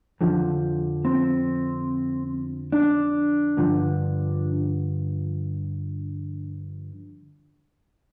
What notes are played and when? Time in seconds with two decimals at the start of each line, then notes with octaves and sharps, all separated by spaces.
0.21 F2 D3 F3
1.05 C4
2.72 D4
3.57 G2 D3 F3